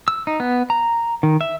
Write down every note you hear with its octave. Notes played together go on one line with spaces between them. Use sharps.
E6
D#4
B3
A#5
D#3
E5